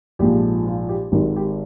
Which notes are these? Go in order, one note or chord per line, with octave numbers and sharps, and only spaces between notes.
A#1 G#2 F3 G4
F4
G4
G#1 G#2 D#3 G4
G4